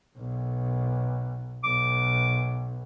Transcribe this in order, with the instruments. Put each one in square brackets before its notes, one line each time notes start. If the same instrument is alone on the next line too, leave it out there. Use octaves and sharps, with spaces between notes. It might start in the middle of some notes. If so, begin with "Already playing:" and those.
[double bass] B1
[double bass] B1 [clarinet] D6